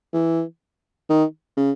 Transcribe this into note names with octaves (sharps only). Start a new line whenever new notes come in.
E3
D#3
C#3